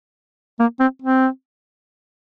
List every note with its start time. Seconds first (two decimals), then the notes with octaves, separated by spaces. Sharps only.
0.60 A#3
0.80 C4
1.02 C4